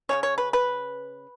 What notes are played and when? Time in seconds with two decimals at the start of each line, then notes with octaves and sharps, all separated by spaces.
0.09 C#3 G#3 C#4 C#5
0.23 C#5
0.38 B4
0.53 B4